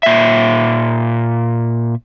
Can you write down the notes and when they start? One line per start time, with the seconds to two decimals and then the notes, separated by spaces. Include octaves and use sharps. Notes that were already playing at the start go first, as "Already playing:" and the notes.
0.03 A#2 E5